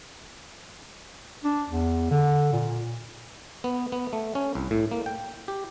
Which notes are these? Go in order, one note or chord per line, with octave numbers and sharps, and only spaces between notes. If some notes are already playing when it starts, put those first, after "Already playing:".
D4
E2
D3
A#2
B3
B3
A3
C#4
C2
A2
A#3
G5
G4